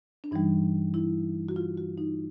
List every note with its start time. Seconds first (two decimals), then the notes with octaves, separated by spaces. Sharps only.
0.24 D4
0.31 G2 E3 G3 D#4
0.94 E4
1.49 F#4
1.56 F4
1.78 F#4
1.98 D#4